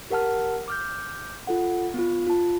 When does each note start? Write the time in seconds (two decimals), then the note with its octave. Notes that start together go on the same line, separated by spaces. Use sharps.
0.10 G4 A#4 F#5 A5 F6
0.68 D6 F6 G6
1.47 F4 A4 F#5
1.94 B3 F4
2.27 F4 A5